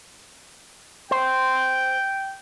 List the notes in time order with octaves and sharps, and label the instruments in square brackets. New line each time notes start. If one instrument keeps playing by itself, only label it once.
[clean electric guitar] C5 [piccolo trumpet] G5